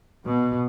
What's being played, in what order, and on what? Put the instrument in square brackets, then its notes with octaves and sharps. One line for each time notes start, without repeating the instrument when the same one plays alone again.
[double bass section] B2